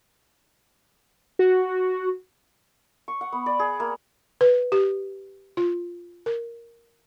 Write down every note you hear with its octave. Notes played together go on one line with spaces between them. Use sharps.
F#4
C#6
F#5
B3
D5
G#4
A#3
B4
G4
F4
A#4